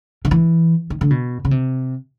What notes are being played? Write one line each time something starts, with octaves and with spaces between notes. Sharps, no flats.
D#3
E3
D#3
D3
B2
C#3
C3